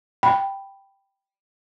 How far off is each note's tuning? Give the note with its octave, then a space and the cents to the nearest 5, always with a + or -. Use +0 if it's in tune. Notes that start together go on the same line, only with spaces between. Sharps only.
G5 +0 B5 +0